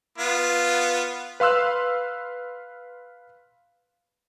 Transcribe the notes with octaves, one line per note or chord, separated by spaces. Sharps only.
B3 F4
B4 F5 C6 E6 F#6